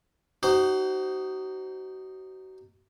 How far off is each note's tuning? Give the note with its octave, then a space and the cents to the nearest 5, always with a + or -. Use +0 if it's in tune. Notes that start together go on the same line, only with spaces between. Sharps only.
D#4 -10 F#4 +35 C5 +0